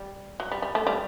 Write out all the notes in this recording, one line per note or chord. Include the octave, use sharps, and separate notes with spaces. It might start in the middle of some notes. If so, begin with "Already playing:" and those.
Already playing: G3
F#3
G3
G3
A3
G3